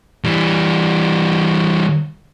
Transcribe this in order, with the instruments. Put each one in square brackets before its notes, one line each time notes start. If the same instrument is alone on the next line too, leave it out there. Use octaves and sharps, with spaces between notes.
[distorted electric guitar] E3 G3